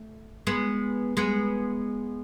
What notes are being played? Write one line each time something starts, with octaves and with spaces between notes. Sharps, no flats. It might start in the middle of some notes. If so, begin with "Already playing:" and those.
Already playing: A3
G#3 B3
G#3 B3